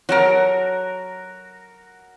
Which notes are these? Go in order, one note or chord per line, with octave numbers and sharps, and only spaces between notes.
F#3 F#4 A4 A#4 A#5